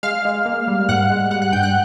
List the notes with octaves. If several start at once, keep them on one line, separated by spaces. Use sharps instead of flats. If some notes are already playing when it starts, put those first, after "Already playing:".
G#3 F5 F6
G#3
A#3
G3
G#2 F#5 F#6
G#3
G3 F#5 F#6
F#5 F#6
G2 G5 G6
F#5 F#6